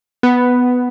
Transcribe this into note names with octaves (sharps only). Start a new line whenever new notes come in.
B3